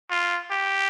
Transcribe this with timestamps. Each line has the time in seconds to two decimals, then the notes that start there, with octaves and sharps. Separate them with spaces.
0.10 F4
0.51 G4